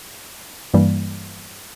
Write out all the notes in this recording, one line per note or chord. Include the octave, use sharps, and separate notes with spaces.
G2 E3 G3 A#3